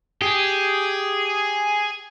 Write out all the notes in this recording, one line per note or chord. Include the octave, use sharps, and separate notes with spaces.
G4 G#4